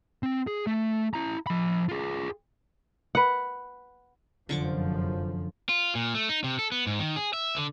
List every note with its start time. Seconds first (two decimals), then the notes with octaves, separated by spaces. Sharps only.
0.23 C4
0.47 G#4
0.67 A3
1.14 E4 A#5
1.47 F3 B5
1.89 F4 G#4
3.15 B4 F#5
4.49 F1 F#2 D3 F3 C#6 D6
5.69 F4
5.95 A#2
6.14 A3
6.29 D#4
6.44 C3
6.59 A4
6.72 B3
6.87 G#2
6.99 D#3
7.16 G#4
7.33 E5
7.57 D3